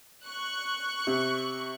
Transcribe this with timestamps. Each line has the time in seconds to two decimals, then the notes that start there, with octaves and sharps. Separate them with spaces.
0.25 C#6 F#6
1.07 C3